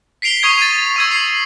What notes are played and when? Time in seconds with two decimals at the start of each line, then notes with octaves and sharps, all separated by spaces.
0.22 B6 C7 D7 F7 G7
0.43 C#6 D#6 G#6
0.58 A6 D#7
0.96 C#6 E6 G#6
1.11 C7